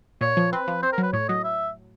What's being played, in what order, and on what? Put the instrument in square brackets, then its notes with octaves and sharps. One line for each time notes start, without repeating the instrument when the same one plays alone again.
[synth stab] A#2 [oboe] C#5
[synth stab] F3
[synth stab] C4 [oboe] B4
[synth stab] F3
[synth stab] C4 [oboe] C5
[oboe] A#4
[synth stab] F#3 [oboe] B4
[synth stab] A2 [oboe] C#5
[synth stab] F#3 [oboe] D#5
[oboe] E5